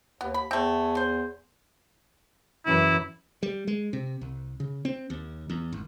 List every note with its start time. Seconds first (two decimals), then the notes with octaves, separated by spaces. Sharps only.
0.21 D#2 B3
0.34 B5
0.51 E2 A3 C4
0.97 C5
2.66 F#2 E3 E4
3.43 G3
3.67 G#3
3.93 C3
4.21 C2
4.60 C#3
4.85 C4
5.10 D#2
5.50 E2
5.73 G#1